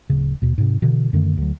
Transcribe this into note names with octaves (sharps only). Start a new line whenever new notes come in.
D1 C#3
D#2 B2
G#2 C3
B2 D3 E3
F#2 D3 D#3 A3
D2 F#3